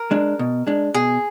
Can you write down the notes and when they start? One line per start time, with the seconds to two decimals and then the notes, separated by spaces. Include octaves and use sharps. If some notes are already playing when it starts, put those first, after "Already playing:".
Already playing: A#4
0.11 G#3 D4
0.39 B2
0.67 G#3 D4
0.94 B2 G#4